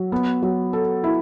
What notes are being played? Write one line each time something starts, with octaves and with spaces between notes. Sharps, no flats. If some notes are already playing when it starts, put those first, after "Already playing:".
Already playing: F#3
B3
F#3
A4
E4